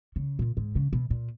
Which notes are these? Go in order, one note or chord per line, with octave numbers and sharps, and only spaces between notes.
C#3
A#2
G#2
C#3
B2
A#2